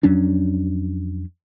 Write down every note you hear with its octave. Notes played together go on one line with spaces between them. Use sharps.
F2 F#3 C#4 D4